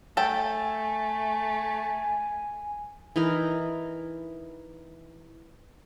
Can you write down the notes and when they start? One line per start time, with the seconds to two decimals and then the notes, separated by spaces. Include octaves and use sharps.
0.17 A3 A4 G5 G#5
3.16 E3 D#4 A#4